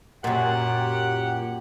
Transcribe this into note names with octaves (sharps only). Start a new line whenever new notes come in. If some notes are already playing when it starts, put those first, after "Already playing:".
F#2 A#2 G4 F#5